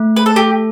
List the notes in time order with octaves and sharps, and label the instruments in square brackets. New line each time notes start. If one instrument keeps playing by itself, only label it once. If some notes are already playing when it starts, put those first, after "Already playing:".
Already playing: [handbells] A3
[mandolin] B4
A4
[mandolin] G4 [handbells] A4